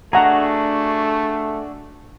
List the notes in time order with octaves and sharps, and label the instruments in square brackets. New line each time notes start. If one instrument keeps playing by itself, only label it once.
[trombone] A3 [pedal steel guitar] D4 F#4 G#4 [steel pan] F#5 A#5